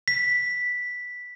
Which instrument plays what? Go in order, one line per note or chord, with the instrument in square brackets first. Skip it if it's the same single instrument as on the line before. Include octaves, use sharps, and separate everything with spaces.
[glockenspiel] B6